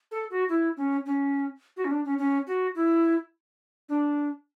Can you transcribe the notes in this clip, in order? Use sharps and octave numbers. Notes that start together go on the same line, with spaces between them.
A4
F#4
E4
C#4
C#4
F#4
C#4
D4
C#4
C#4
F#4
E4
D4